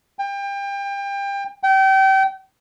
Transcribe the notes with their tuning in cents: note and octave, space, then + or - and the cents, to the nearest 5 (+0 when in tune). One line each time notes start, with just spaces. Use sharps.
G5 +30
G5 -30